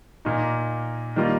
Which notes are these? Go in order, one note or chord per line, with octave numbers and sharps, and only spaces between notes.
A#2 A#3 D#4
D#3 G3 A#3 F4